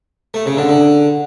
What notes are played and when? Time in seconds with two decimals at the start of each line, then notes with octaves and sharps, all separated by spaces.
0.34 A3
0.46 C#3
0.57 D3
0.69 D3